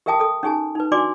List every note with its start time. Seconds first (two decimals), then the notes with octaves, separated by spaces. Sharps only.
0.06 G4 A#4 E5 G5 A5 D#6
0.20 A4 D#6
0.43 C#4 D#4 G4 G#4 G#5 A5
0.75 D#4 B4
0.92 D4 F#4 D5 G#5 C6 D6